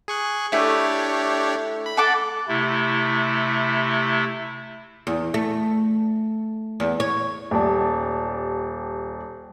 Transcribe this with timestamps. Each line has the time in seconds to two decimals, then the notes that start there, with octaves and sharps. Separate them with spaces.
0.08 G#4 C#6 F#6
0.52 A3 D4 E4 G4 C#5
1.86 B5
1.97 A4 F#5 D6
2.48 C3 A3 E4
5.07 E2
5.34 A3
6.80 E2
7.00 C#5
7.51 D#1 G4 D5 A5